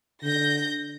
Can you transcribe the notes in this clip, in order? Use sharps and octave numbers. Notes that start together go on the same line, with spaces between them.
D3 G6 A#6